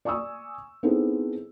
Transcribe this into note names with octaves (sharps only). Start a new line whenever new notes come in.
D5 G#5 C#6 D#6 E6
B3 C4 D#4 E4 G#4 A4